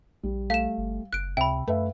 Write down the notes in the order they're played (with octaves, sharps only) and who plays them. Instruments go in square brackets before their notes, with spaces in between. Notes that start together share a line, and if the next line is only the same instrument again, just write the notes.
[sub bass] A#1 [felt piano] G3
[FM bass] A3 [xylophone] F5 E7
[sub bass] G1
[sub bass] F#1 [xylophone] F#6 D7
[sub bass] C#2 [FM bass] C3 [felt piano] E5 [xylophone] G5 B5
[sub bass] F#2 [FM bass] A3 [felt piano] B4 E5 F5